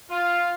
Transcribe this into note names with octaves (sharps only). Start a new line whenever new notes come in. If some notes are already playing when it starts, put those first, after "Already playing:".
F4